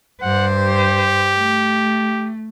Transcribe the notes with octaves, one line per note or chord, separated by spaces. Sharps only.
G2 C5 F#5
G4
A3